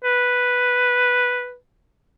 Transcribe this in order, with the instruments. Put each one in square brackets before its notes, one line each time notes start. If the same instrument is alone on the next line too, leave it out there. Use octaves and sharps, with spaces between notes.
[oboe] B4